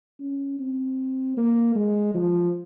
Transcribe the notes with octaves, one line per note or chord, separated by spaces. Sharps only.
C#4
C4
A#3
G#3
F3